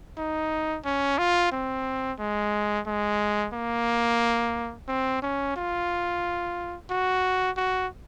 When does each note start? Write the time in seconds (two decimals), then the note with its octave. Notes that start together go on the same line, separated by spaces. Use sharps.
0.18 D#4
0.85 C#4
1.18 F4
1.52 C4
2.20 G#3
2.87 G#3
3.53 A#3
4.88 C4
5.22 C#4
5.56 F4
6.90 F#4
7.57 F#4